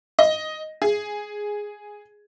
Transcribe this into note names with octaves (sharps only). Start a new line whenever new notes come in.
D#5
G#4